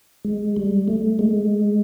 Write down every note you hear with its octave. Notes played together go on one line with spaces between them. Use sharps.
G#3
G3
A3
G#3